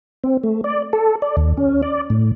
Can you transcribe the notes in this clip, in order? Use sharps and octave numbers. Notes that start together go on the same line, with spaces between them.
C4
A3
D5
A4
D5
D#2
C#4
D5
A2